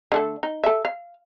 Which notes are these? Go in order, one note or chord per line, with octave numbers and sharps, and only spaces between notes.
D3 A3 A4
D#4
A4 E5
F5